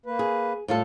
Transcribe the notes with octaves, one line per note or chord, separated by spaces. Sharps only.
A#3 B4
G#4
A2 G3 F4 A4